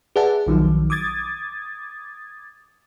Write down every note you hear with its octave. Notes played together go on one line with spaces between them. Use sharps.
G#4 B4 D5 E5 F#5 A5
B1 D#3 F3 F#3
D6 D#6 G#6 A6